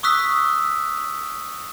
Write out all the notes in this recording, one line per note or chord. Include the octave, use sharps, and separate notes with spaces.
C#6 D#6 E6 F#6 B6